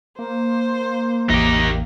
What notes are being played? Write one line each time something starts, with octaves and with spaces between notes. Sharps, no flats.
A#3 C5
A1 E2 D#4 G4